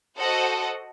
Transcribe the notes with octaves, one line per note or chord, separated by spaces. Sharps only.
F#4 A4 C5 D#5 F#5